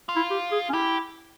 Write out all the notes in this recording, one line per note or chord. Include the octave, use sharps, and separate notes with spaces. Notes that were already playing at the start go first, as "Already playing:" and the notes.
F4
E4
G4
G#4
C#4
E4 G4